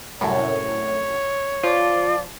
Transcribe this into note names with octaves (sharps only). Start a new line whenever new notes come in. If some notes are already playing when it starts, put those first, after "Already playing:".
C2 F#2 A2 C#5
F3 F4 D5